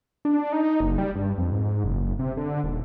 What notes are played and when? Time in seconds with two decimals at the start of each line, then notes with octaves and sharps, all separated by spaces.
0.25 D4
0.52 D#4
0.80 F#1
0.98 G3
1.15 G2
1.38 F2
1.52 G#2
1.84 F#1
2.00 F#1
2.19 C3
2.37 D3
2.64 D#1